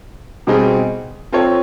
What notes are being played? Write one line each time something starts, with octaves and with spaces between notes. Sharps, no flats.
B2 G3 C4 D#4 G#4
C4 F4 A4 C#5